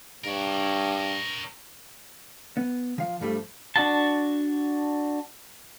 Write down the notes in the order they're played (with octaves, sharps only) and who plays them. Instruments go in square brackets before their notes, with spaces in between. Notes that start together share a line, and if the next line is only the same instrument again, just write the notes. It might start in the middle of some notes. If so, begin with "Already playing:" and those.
[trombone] G2 [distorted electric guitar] A#4 C#5
[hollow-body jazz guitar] B3
F3 F5
G2 F3 G3 A3
[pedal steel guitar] D4 F#4 A5